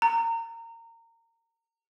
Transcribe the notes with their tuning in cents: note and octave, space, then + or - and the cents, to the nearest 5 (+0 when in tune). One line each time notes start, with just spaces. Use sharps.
A#5 -25